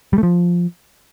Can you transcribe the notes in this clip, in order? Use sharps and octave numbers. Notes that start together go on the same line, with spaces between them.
G3
A3
F3